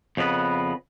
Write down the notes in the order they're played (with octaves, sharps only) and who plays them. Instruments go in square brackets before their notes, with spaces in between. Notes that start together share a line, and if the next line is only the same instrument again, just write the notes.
[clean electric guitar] F2 C#3 B3 A4 B4